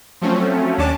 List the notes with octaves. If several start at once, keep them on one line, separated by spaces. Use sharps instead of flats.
F3 F#3 A3 C4 C#4
D#2 C#4 D4 A5 D6